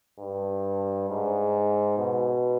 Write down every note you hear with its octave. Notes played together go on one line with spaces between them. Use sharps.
G2
G#2
B2